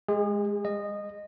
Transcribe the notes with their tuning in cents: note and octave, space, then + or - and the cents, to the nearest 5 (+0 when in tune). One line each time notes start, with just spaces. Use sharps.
G#3 +0 G#4 -40
G#3 -40 D#5 -15